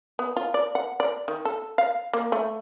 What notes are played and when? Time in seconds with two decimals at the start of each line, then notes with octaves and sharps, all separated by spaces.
0.19 B3
0.37 F4
0.54 D5
0.75 F#5
1.00 D5
1.28 D#3
1.45 A4
1.78 F5
2.13 A#3
2.32 A3